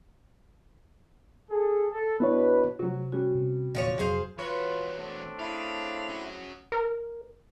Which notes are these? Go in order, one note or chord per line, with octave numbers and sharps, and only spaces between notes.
G#4 A4
A4
B2 B3 D4 E4 B4 C#5
C3 F#3 F#4
G3 C#4 F#4
C3 C4
D#1 E2 A#2 D3 F3 C#5
F1 F2 F#3 G#4 C5 F5
E2 F4 F#4 B4 C#5
A3 C4 D4
C#3 E4 F5
C#4 F#4
A#4